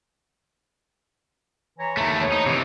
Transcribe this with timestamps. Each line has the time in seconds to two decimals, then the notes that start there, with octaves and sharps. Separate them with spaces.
1.79 E3 C#5 A#5
1.97 D#2 A3
2.19 B3 C5 C#5
2.32 D#4
2.46 C3 E3